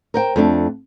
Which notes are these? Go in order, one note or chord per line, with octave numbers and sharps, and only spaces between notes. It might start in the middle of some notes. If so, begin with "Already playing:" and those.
A#4 C5 G5
F2 A3 D4